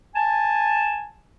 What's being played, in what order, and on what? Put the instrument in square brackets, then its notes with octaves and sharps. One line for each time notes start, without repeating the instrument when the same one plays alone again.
[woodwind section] G#5 A5